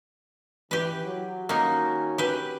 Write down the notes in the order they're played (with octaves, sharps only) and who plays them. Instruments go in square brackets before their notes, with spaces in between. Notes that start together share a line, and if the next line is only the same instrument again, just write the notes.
[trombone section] E3 [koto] G4 B4
[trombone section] F#3
[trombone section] D#3 C#4 F#4 [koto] A#3 D#4
[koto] G4 B4